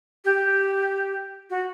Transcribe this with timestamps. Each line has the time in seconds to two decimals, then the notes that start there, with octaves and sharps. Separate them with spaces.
0.25 G4
1.50 F#4